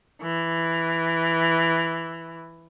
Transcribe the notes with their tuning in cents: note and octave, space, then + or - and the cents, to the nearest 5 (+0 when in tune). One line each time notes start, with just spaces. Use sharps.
E3 +5